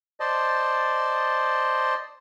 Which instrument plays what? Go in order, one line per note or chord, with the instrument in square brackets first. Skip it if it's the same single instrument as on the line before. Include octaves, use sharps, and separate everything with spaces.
[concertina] C5 D5 D#5 A5